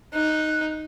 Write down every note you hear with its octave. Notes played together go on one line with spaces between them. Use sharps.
D#4 F#6